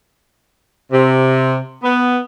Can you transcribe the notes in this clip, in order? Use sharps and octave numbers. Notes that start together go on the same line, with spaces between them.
C3
B3